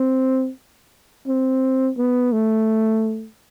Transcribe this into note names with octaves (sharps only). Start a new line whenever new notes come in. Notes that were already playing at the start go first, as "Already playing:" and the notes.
Already playing: C4
C4
B3
A3